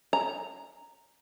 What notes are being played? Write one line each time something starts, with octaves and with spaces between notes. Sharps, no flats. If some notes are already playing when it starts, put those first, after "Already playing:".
A#5